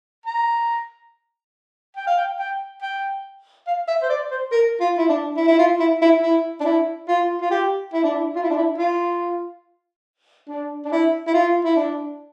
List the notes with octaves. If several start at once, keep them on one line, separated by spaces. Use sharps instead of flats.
A#5
G5
F5
G5
G5
G5
F5
E5
C5
D5
C5
A#4
F4
E4
D4
E4
E4
F4
E4
E4
E4
D4
E4
F4
F4
G4
E4
D4
E4
F4
E4
D4
E4
F4
D4
D4
E4
E4
F4
E4
D4